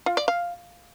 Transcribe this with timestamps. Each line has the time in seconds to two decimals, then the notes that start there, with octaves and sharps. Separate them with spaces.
0.06 F4
0.17 D5
0.28 F5